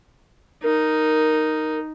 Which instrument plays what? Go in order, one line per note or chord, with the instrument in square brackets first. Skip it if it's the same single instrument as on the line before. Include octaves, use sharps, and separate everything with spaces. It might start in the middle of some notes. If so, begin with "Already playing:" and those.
[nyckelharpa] D#4 [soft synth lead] A#4